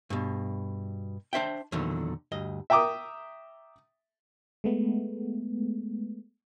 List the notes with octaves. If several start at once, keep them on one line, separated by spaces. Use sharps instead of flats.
G2 B2
D4 C5 E5 G5
E2 A#2 D3 D#3 F#3
D2 G2 D#5
E5 G5 A#5 D6 D#6
G#3 A3 B3